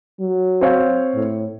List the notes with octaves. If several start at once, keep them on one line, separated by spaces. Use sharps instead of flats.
F#3
C4 C#5 F5
A2